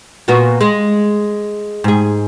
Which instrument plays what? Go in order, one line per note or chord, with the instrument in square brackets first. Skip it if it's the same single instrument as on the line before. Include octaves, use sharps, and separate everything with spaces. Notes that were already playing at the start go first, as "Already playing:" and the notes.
[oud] A#2 B3 F#4
G#3
G#2 G#4